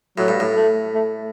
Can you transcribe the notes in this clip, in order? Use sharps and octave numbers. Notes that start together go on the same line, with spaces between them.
A2 F#3
G2
A2
A3
A3